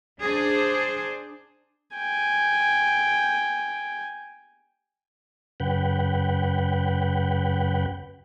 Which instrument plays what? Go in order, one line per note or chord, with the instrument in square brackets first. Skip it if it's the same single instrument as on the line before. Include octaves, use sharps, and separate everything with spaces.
[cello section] D4 G#4 C5
[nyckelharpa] G5 G#5
[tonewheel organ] F#2 C#3 B4 F#5 G5